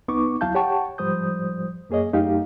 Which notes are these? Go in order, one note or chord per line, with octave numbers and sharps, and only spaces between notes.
C2 B3 D#4 C#6 D6
D2 F#3 E4 F5 A5 G6
G4 C#5 F#5 G5 A5 C#6
G#2 F3 G3 C5 D#6 G6
F#2 A#3 G#4 C#5 D#5
F#2 A3 D#4 G4 F5